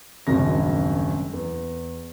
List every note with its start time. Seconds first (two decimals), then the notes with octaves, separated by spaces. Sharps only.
0.27 D#1 G#1 F#2 C#3 D4 A#6
1.33 E2